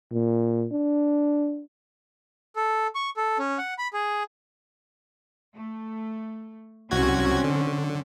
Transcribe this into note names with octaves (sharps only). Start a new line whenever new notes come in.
A#2
D4
A4
C#6
A4
C#4
F#5
B5
G#4
A3
C2 F#3 C4 C#4 F#4 G#6
D3